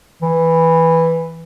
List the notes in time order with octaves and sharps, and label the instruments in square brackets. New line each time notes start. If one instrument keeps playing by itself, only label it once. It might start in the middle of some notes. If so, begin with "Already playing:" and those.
[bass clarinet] E3